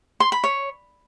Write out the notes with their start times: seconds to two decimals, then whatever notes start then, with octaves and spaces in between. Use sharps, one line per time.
0.20 C6
0.32 B5
0.44 C#5